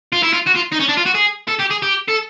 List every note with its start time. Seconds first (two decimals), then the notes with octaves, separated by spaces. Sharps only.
0.12 F4
0.23 E4
0.33 F4
0.46 F#4
0.55 F4
0.72 D#4
0.80 C#4
0.88 D4
0.97 F4
1.06 F#4
1.15 G#4
1.49 A4
1.60 G4
1.71 G#4
1.83 G4
2.08 A4